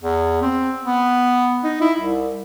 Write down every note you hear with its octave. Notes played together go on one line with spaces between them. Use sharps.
E2
C4
B3
D#4
E4
C2